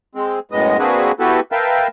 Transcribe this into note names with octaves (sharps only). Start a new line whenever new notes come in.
G#3 C4
F#2 A2 G#3 B3 D#5
A#3 C4 D4 F#4 G#4 B4
B3 E4 F#4 G4 A4 B4
A#4 B4 E5 F5 G5 A5